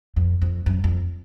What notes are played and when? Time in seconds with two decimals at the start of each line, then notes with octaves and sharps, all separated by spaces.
0.16 F2
0.42 F2
0.66 F#2
0.84 F2